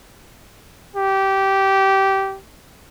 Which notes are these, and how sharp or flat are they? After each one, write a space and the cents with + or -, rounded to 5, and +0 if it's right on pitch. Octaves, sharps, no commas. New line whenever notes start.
G4 -15